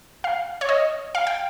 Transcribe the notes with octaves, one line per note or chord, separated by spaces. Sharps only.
F5
C#5
D#5
F5
G5